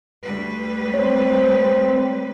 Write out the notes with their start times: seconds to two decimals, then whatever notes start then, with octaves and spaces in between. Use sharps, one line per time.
0.23 D2 G3 B4
0.94 C4 C#5